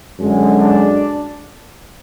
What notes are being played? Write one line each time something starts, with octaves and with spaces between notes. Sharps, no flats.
F#2 D3 G#3
D4